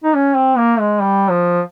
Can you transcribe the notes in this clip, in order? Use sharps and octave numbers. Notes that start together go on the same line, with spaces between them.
D#4
C#4
C4
A#3
G#3
G3
F3